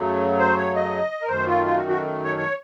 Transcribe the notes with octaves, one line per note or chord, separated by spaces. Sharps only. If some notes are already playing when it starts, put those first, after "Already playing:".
Already playing: F#2 C#3 F#3 A3
C5
C#5
D#5
A#4
F#2 D#3 A3 C5
F4
F4
F#4
F#4
C#5
C#5